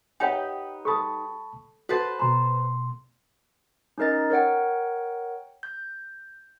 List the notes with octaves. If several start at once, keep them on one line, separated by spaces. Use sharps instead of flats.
D#4 G4 B4 C#5 F#5 G5
A4 A5 B5 C#6 D#6
F#4 A4 B4 C5 A5
B2 A#5 C6
C#4 D#4 A#4 D#5 A6
A#4 C#5 F#5 G5
G6